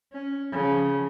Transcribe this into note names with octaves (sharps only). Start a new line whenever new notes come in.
C#4
C#3 F3